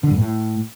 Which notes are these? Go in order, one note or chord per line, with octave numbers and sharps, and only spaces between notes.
D3
G2
A2